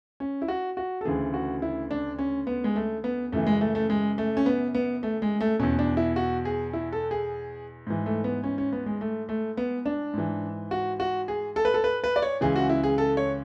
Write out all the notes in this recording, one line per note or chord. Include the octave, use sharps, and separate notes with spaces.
C#4
E4
F#4
F#4
A4
D2 C#3 E3 G#4
F#4
E4
D4
C#4
B3
G#3
A3
B3
F#2 C#3 E3 A3
G#3
A3
A3
G#3
A3
C#4
B3
B3
A3
G#3
A3
E2 B2 C#4
D4
E4
F#4
G#4
E4
A4
G#4
G#2 E3
A3
B3
C#4
C#4
B3
G#3
A3
A3
B3
D4
G#2 E3
F#4
F#4
G#4
A4
B4
A4
B4
B4
D5
C#5
C#2 C#3 E3 G#4
F#4
E4
G#4
A4
C#5